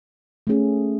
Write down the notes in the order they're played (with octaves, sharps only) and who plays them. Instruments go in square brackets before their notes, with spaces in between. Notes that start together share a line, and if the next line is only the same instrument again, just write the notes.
[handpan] A3 C#4 G#4